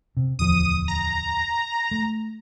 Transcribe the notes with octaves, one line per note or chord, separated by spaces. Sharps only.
C3
D1 E2 F3 D#6
A#5
A3